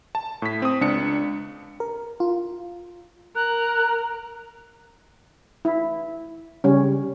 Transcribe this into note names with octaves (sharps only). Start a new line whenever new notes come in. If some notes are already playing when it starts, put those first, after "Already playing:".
A5
A2 B6
C4 D#6
C#2 D4 C#7
A#4
F4
A#4 F#6
E4
C#3 G3 C#4